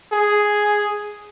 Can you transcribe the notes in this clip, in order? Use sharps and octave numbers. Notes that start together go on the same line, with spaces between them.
G#4